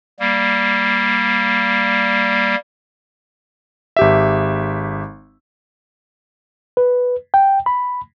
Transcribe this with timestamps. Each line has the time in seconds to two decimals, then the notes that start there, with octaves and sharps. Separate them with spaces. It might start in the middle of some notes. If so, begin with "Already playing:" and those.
0.20 G3 A#3
3.97 G#1 G4 E5
6.77 B4
7.34 G5
7.66 B5